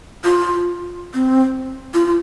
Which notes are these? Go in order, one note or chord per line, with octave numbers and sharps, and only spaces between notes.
F4
C4
F4
F4